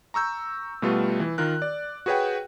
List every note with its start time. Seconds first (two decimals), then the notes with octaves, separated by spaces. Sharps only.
0.14 A#5 C#6 E6 G6
0.82 B2 G3 A3 F4 F#4 B4
1.20 E3
1.38 D#3 F4 A#4 F#6
1.62 D5
2.06 F#4 G#4 B4 C#5 F#5 G5